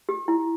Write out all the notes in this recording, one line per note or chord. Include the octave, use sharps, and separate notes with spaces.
G4
E4